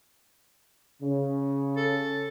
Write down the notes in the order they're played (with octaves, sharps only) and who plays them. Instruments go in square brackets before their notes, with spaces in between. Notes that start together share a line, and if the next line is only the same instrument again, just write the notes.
[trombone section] C#3
[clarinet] A4